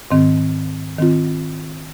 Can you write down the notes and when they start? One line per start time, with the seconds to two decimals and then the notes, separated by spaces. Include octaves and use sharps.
0.11 G#2 D#3 C4
0.98 D#3 C4 F4